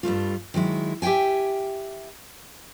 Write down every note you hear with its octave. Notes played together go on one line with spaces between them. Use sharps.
G2 G3 A3 F4
D#3 F#3 G#3 E4
G4 E5 F5 G5 G#5